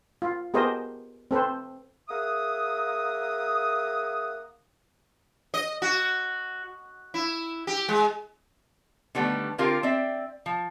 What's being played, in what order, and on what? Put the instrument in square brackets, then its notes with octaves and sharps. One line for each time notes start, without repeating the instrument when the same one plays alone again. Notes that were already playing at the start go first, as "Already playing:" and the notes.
[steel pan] F4
B3 G4 G#4 A#4 C5 D#5
C4 A4 B4 C5
[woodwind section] A#3 G#4 E5 F#5 D#6
[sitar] D#5
F#4
E4
G4
G#3
[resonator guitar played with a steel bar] D3 D#3 G3 A3 B3 D4
D3 C4 F4 G4 A#4
C4 D5 E5
F3